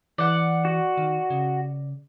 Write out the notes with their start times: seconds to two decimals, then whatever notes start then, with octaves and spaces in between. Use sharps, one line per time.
0.18 E3 D5 F#5
0.65 F#4
0.97 D#3
1.30 C#3